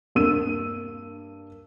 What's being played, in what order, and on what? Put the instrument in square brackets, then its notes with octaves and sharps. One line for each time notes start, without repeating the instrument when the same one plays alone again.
[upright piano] G2 A#3 E6 D#7